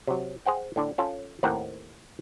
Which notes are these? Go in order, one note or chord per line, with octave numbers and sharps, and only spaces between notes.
C3 F#3
G#4 C5 F#5 G5
A2 D3 D4
C#4 F4 A4
D#2 A2 C4 A#4 F#5 G5